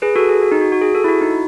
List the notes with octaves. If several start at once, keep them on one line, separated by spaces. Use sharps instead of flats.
G#4 B4
F#4 A4
G#4
F#4
D#4
F#4
F#4
G#4
F#4 A4
E4
F#4
D#4